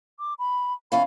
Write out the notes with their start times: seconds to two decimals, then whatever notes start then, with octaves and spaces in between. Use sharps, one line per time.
0.19 D6
0.39 B5
0.92 E2 C#4 F5 B5